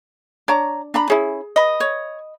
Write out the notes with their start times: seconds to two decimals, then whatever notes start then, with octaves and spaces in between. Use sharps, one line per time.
0.48 D4 C#5 A#5
0.94 D4 A#5 B5
1.10 C#4 E4 G#4
1.56 B4 D#5
1.80 C#5